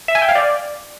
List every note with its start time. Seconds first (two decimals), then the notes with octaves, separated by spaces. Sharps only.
0.08 E5
0.15 G#5
0.22 G5
0.29 F5
0.35 D5